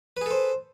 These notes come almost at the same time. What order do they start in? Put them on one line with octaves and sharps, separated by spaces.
B4 G#4 A4 C5